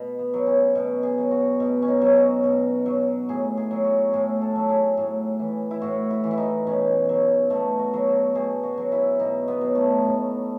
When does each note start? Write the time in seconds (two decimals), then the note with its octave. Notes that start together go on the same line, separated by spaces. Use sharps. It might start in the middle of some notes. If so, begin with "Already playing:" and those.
Already playing: B2
0.19 B3
0.34 F#3
0.47 C#4
0.75 B2
1.03 G#4
1.18 F#3
1.31 F#4
1.60 B2
1.82 C#4
1.88 D#4
2.01 F#3
2.17 F#4
2.44 B2
2.86 F#3
3.29 A2 G#4
3.57 G#4
3.71 F#3
3.84 F#4
4.13 A2 G#4
4.42 A4
4.56 F#3
4.69 G#4
4.97 A2
5.39 E3
5.71 E4
5.82 A2 F#4
6.11 E4
6.24 E3
6.31 E4
6.38 D#4
6.67 B2 C#4
7.09 F#3
7.50 B2 A3
7.79 F#4
7.94 F#3
8.07 F#4
8.35 B2 G#4
8.63 F#4
8.78 F#3
8.92 E4
9.19 B2 D#4
9.48 B3
9.61 F#3
9.75 A3
10.05 A2